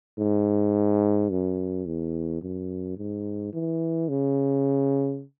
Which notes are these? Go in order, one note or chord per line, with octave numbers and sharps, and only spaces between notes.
G#2
F#2
E2
F#2
G#2
E3
C#3